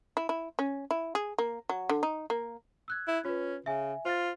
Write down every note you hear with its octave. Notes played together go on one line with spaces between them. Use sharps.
E4
E4
C#4
E4
G#4
A#3
F#3
D3
D#4
A#3
E6 F#6 G#6
E4
C#4 F4 B4
C#3 E5 G#5
F4 C5 A6